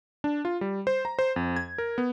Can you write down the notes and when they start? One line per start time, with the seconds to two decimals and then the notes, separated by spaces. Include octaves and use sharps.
0.24 D4
0.45 F4
0.61 G3
0.87 C5
1.05 A#5
1.19 C5
1.36 F2
1.56 G#6
1.78 A#4
1.98 B3